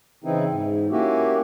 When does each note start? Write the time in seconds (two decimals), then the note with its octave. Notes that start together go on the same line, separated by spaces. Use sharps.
0.24 C#3 E3 C4 D#4 E4
0.48 G#2
0.91 A#3 C#4 E4 F#4 G4